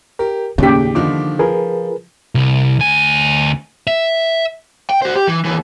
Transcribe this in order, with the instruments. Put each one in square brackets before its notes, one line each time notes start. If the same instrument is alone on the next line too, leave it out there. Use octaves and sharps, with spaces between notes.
[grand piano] G4 [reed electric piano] A#4
[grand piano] D#2 B6 [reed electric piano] A2 [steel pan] C#3 G4 [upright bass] A#3 D#4
[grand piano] D3 D#3 F3 [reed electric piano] D6
[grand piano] F3 [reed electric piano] G#4 A#4 B4
[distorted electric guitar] C2
D2 G#5
E5
[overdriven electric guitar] G5
F#4 C5
G4
E3
D#2 E3